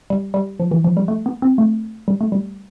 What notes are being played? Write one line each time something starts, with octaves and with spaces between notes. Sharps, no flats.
G3
G3
F3
E3
F3
G3
A3
B3
C4
A3
G3
A3
G3